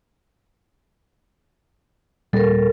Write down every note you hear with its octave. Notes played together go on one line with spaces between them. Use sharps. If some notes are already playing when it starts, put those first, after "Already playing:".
D#1 A#2 G3 A4 A#4